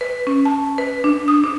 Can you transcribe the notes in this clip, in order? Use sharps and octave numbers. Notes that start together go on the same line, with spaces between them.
B4
C#4
A5
B4
D4
D#6
D4